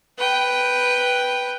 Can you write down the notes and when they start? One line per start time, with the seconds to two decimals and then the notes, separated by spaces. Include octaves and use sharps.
0.18 B4 G5